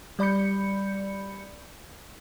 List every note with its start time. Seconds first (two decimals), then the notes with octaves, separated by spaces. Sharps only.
0.19 G3 D5 B5 G6 C#7